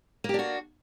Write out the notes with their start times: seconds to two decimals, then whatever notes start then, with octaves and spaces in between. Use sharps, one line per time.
0.24 A#3
0.29 G4
0.34 D4
0.39 F#4